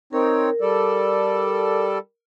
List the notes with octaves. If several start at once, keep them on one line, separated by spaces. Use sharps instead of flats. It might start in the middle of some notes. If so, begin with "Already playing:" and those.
C4 D#4 A#4 C#5
G3 A4 D5